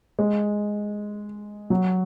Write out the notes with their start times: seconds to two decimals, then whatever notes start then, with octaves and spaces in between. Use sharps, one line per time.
0.19 G#3
1.70 F#3